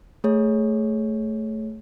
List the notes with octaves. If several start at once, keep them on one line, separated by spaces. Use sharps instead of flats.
A3 G#4 C#5